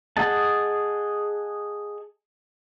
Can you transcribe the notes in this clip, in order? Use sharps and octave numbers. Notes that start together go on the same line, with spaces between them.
G#4 D#5 F#5 A5